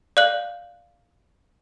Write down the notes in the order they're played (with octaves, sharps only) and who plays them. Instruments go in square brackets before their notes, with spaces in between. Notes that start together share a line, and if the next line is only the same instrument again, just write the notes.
[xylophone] D5 F5 F#6 F#7